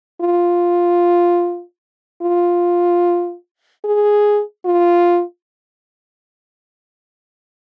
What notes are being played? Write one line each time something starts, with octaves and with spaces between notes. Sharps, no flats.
F4
F4
G#4
F4